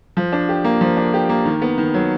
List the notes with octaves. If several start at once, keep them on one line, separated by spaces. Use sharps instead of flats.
F3
D4
G4
A#3
F3
D4
G4
A#3
D#3
B3
D#3
F#3